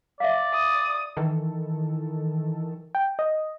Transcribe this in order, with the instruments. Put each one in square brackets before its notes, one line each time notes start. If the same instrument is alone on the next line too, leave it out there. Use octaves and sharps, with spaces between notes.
[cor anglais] D5 [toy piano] E5 F5
[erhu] D#6
[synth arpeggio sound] D#3 E3 A4
[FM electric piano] G5
D#5